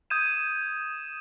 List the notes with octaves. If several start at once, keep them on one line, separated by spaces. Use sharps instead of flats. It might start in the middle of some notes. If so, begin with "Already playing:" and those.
D#6 G6 G#6 D#7 E7